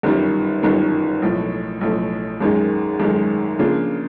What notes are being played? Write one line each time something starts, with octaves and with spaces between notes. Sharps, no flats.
G1 F#2 D#3 G3
G1 F#2 D#3 G3
B1 A2 F3 A3
B1 A2 F3 A3
G#1 F#2 D#3 G#3
G#1 F#2 D#3 G#3
C#3 F3 A#3 D4 F4